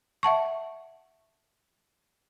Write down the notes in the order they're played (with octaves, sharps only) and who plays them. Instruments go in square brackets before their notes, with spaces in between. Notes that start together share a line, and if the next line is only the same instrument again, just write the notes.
[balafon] E5 F#5 A5 C#6